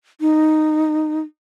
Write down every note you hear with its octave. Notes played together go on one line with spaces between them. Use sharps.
D#4